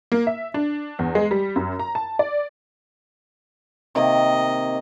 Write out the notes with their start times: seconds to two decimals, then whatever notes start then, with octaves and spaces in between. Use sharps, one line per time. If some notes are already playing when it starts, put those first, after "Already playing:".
0.12 A#3
0.27 E5
0.54 D4
0.99 E2
1.15 G#3
1.31 G3
1.56 F#2
1.79 A#5
1.95 A5
2.19 D5
3.95 C3 D#3 A#3 D#5